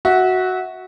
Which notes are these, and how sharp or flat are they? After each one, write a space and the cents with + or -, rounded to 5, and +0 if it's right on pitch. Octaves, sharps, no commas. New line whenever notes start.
F#4 +0 E5 -25